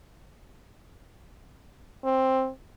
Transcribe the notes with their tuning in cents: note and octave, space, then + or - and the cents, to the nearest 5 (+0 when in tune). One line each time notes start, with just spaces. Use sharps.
C4 +10